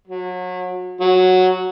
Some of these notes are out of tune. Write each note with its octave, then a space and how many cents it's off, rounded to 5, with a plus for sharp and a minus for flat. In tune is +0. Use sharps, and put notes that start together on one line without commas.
F#3 -30
F#3 -5